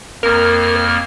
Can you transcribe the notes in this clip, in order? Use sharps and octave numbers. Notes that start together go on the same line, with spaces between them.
F2 A#3 A#4 F6